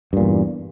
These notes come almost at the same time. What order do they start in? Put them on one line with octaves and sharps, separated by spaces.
G2 A#2 E2